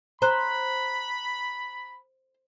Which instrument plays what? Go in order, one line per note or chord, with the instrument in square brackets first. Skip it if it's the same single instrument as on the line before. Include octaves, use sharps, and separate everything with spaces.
[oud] C5 [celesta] A#5 F#6 [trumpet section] B5